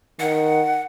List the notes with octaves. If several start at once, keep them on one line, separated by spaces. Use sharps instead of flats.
D#3 F#5